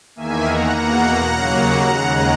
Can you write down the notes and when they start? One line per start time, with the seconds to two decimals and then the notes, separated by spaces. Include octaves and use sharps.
0.16 E2 D#3 A#3 E5 G#5
0.45 F#5 A#5
0.75 E2 B2 A#3 F#5 A#5
1.34 D#2 C#3 F#3 A#3
1.93 D#2 C#3 G#3